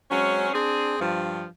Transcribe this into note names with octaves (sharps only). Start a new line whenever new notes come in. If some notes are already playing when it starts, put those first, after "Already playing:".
F#3 G#3 C4 C#4
C4 D4 G#4
G2 F3